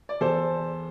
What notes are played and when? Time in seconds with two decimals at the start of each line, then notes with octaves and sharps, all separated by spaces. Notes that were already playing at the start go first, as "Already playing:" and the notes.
0.09 D5
0.21 E2 A4 C5